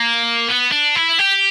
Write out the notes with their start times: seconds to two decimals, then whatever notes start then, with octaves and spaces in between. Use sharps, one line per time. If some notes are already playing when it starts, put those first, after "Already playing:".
Already playing: A#3
0.49 B3
0.72 D4
0.95 E4
1.19 G4